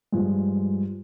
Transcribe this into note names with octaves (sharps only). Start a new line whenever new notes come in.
G2 F3 G#3